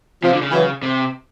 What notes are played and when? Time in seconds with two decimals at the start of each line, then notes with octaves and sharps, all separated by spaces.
0.23 C3 F3
0.33 D3
0.42 C#3
0.52 E3 F#3
0.82 C3